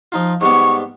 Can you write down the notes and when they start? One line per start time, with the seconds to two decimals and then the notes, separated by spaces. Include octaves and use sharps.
0.12 F3 D#4 F4
0.41 G#2 G3 B3 C#6